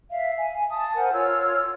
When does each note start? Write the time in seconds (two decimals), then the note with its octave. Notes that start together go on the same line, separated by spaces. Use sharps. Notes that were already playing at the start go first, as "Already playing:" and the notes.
0.11 E5 F5
0.37 G#5
0.70 A5 D#6
0.95 A#4 C5 F#5 G#5
1.12 F4 C#5 E6 F6